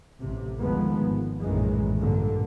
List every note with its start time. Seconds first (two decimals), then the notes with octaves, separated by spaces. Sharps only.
0.20 A1 F#2 C3
0.58 D2 D#3 F3 G#3 B3
1.00 G#1
1.40 A#1 F#2 A2 D#3 E3 G#3
1.98 G2 A#2 D3